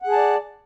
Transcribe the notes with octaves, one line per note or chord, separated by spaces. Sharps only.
G#4 D5 F#5 A5